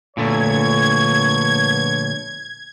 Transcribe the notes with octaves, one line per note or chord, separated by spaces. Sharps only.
A#1 A#2 D3 A3 B3 C#5 G#6